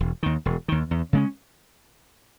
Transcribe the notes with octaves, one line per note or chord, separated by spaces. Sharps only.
E1
D#2 D#3
E1
D#2 D#3
E2
C#3 G#3 C#4